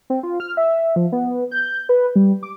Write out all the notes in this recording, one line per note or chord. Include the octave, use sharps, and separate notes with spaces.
C4
F4
F6
E5
F3
B3
G6
B4
G3
D6